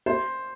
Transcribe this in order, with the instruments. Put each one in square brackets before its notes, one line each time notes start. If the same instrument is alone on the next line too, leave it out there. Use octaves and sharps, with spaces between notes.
[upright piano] C5